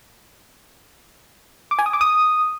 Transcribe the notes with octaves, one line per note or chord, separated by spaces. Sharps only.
D6
G#5
D#6
D6
D#6